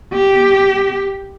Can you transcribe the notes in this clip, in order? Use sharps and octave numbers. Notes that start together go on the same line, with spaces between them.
G4